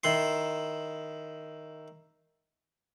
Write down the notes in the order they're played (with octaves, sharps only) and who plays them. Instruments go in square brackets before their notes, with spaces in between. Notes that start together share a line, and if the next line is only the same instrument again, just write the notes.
[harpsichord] D#3 E4 C6